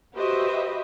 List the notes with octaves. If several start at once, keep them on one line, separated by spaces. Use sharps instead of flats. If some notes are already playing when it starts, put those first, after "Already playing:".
F#4 G4 B4 C5 D#5 E5